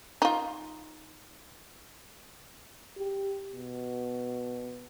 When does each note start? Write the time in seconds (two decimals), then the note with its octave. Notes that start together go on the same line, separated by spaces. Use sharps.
0.22 D#4 F4
2.99 G4
3.52 B2